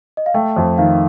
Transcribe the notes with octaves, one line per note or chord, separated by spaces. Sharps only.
D#5
F5
A3 G5
F2
D#3 F5